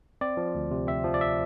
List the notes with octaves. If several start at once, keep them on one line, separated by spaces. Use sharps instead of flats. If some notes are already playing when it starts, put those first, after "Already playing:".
C4 D5
F3
D2
C3
C4 E5
F3
D5
E5